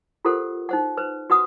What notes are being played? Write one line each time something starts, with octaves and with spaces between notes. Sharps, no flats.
F4 G4 A4 A#4 C5 F#5
D#4 C5 F#5
B4 C5
F#4 B4 F#5 D#6